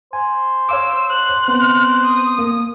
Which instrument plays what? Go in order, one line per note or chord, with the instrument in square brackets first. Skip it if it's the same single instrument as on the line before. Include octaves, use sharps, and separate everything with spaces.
[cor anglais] C5 [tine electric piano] G#5
[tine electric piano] C#5 F5 D6 [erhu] E6
[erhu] F#6
[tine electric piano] B3 C4 [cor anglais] C5
[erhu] D#6
[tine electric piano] A#3